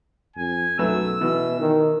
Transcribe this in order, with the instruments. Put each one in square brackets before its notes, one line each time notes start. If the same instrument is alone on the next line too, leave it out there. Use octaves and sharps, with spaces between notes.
[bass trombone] F2 [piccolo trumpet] G#5
[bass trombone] B1 [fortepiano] F#3 A3 B4 [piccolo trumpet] E6
[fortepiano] B2 [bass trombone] E3
[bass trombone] D#3